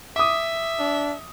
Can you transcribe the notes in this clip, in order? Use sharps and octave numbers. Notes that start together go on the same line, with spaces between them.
E5 D6 D#6
D4